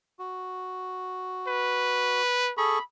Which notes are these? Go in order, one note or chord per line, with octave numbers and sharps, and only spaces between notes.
F#4
B4
G#4 A4 B5 C#6